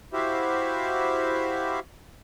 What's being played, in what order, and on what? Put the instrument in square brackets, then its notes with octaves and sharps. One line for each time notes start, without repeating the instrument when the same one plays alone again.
[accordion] E4 F#4 G4 C5 E5 F5